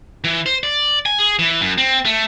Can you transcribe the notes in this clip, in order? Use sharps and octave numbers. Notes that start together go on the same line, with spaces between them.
E3
C5
D5
G#5
G#4
E3
F#2
C4
A3